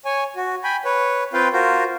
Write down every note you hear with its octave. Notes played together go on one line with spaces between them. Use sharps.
C#5 G#5
F#4
G5 G#5 B5
B4 C#5
C4 F4 B4 F5 G5
F4 F#4 A#4 C5